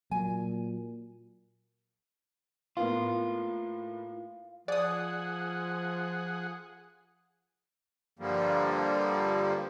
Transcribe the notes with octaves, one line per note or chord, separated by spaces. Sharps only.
A#2 F#3 G#5
A2 A#3 B3 F4 F5
F3 G#4 D5 F#5 D#6
G2 D3 F3 G3 A#3